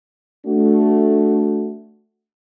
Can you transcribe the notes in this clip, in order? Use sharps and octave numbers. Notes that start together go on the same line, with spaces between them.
A3 D4 F#4